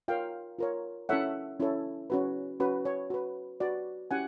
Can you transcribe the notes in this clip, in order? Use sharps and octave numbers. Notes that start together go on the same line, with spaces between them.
F4 A#4 C#5 F5 G5
F4 A#4 C#5
C#4 E4 A4 C#5 E5 F#5
C#4 E4 A4 C#5
C#4 F#4 B4
C#4 F#4 B4
C#5
F#4 B4
F#4 B4 D5
C#4 E4 G4 F#5 G#5